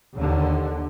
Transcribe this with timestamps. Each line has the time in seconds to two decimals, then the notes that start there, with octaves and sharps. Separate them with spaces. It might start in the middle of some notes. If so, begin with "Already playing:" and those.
0.16 D#2 D3